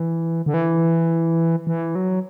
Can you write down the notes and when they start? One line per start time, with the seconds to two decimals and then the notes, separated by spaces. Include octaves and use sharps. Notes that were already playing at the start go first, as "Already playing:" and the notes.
Already playing: E3
0.46 D3
0.54 E3
1.67 E3
1.95 F#3